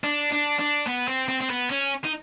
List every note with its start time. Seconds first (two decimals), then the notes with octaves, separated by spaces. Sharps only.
0.04 D4
0.32 D4
0.59 D4
0.87 B3
1.08 C4
1.28 C4
1.41 C4
1.50 B3
1.70 C#4
2.05 D#4